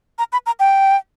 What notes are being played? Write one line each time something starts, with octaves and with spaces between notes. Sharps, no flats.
A#5
B5
A#5
G5